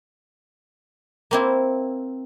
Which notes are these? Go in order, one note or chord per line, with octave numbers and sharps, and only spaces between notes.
A#3 C4 E4